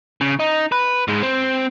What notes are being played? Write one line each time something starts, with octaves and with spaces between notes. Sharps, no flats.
C#3
D#4
B4
G#2 G#3
C4